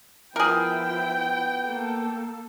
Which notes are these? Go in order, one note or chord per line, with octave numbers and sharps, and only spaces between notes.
F3 B3 E4 G#4 A#4 G5
A#3 A4